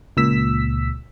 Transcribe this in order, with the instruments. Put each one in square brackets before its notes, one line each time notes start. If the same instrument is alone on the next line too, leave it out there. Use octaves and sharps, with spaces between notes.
[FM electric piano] C#2 A#2 E6 B6